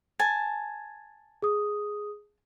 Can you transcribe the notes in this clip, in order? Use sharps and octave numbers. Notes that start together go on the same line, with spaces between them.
G#5 A5
G#4 D#6